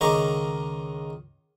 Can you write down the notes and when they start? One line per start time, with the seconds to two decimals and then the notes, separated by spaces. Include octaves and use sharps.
0.01 C#2 D#3 D#4 A#5 C#6 D6